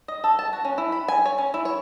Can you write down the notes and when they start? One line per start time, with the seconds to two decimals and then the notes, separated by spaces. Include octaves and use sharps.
0.08 D#5
0.24 A4
0.39 A5
0.53 F#4
0.65 C#4
0.78 E4
0.92 B5
1.08 G#5
1.26 C#5
1.38 C#4
1.54 E4
1.65 C#5